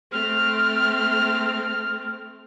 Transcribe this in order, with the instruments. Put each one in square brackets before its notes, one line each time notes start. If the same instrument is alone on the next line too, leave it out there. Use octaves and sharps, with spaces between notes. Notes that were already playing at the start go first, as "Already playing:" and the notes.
[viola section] A3 C4 [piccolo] F6